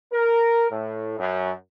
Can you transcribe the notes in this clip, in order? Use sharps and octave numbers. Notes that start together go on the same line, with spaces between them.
A#4
A2
F#2